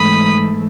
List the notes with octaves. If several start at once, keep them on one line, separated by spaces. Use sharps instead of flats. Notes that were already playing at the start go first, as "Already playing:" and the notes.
Already playing: G#2 E3 A3 B5 D#6